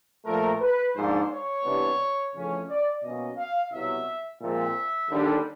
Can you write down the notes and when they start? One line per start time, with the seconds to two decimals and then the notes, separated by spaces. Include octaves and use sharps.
0.25 A#2 F3 A3 A#4
0.61 B4
0.95 G#2 F3 A#3 D4 C5
1.30 C#5
1.64 C3 E3 G3 B3 D4
2.33 F2 C#3 E3 A3 C#4
2.68 D5
3.02 B2 F#3 A#3 C#4 D#5
3.37 F5
3.71 C2 B2 F#3 E5
4.40 A#2 F3 G#3 C4 E5
5.09 D#2 D3 G3